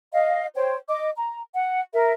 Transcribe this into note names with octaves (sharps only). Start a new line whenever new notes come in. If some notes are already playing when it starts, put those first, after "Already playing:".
D#5 F5
C5 C#5 G5
D#5 D6
A#5
F#5
A#4 E5